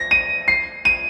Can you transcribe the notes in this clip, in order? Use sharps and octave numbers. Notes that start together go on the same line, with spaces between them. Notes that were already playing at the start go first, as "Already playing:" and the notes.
Already playing: A#6
D#7
C7
D#7